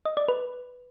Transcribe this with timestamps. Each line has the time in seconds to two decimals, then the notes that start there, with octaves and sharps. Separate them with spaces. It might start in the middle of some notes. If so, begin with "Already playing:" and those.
0.05 D#5
0.17 D5
0.28 B4